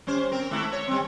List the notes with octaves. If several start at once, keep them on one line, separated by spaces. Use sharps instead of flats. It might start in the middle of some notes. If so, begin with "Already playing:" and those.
G3 C#4 C5
C4 A#4
G#3 A3 E4
C#5
G3 C4